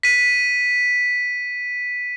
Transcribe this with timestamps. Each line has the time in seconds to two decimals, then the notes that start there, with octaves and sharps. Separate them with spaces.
0.03 B6 D#7